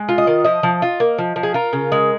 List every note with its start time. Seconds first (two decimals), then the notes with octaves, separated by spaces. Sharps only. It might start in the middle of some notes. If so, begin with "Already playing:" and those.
Already playing: G#3
0.09 F4
0.18 D#5
0.27 D#3
0.44 F3 D#5
0.63 F3
0.82 F4
1.00 A#3
1.18 F3
1.36 F3
1.43 G#4
1.54 F4 A#4
1.73 C#3
1.92 G#3